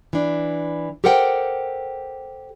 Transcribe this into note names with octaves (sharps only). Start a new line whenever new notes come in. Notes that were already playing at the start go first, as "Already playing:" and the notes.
E3 D4
G4 A4 A#4 C5 F#5 G5